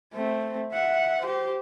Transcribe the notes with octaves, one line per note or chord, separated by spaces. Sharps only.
A3 C4
E5 F#5
G4 C5